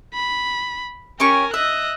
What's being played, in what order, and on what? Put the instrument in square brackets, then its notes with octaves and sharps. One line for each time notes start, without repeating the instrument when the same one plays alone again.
[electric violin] B5
[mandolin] C#4 G4 C#6 [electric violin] A#4 G#5
[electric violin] D#5 F#6 [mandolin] E5